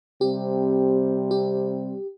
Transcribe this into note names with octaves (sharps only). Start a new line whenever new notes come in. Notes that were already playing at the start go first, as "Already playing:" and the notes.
C3 G3 C4 G4
G4